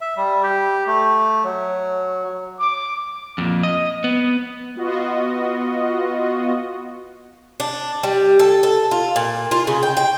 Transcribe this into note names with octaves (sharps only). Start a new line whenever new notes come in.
E5
G3
G4
A3
F#3
D6
F2 A#2
D#5
B3
B3 F4 F#4 D#5
D4
G3
A4
A4
F4
A#2
F4
C#3
G5
G5